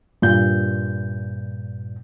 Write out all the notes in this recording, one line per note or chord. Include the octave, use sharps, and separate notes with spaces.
G2 A#2 G6